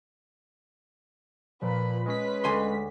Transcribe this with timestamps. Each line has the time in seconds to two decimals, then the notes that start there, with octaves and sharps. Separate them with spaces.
1.62 A#2 F3 B4 B5
2.06 G#3 C#4 B4 B6
2.44 D2 G#5 C6